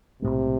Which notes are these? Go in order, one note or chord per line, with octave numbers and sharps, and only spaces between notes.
B1 A2 C3 G#3